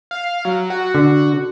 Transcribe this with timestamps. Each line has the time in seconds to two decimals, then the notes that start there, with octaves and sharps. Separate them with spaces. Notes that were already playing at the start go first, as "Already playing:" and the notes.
0.11 F5
0.45 F#3
0.70 F#4
0.95 D3